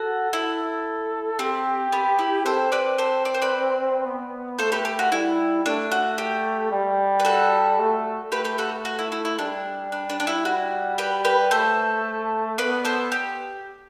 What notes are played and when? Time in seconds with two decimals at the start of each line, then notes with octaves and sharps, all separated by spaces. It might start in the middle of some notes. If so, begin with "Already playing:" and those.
Already playing: F#4 A4
0.33 E4 A4
1.39 C4 G4
1.92 B3
2.19 E4
2.45 C4 A4 C5
2.72 B4 D5
2.98 A4 C5
3.25 D5
3.35 C5
3.42 B4 D5
4.05 B3
4.59 A3 A4 C5
4.72 G4 B4
4.85 G4
4.99 F#4
5.12 G3 E4
5.66 A3 D4
5.92 F#4
6.18 G4
6.71 G3
7.20 B4
7.25 F#4 A4
7.79 A3
8.32 A3 G4 B4
8.44 G4 B4
8.58 F#4 A4
8.85 F#4
8.99 E4
9.12 E4
9.25 E4
9.39 G3 D4
9.92 D4
10.10 D4
10.20 D4
10.27 E4
10.44 G3 F#4
10.98 G4 B4
11.25 G4 B4
11.51 A3 A4 C5
12.58 B3 B4 D5
12.85 A4 C5
13.12 G4